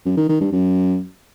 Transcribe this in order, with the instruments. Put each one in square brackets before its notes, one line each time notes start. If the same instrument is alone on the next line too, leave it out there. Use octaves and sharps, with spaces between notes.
[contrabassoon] F#2
D#3
D#3
G2
F#2